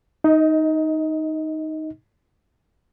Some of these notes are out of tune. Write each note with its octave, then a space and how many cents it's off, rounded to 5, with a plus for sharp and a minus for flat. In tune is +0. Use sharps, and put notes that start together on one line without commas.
D#4 +5 D#5 +25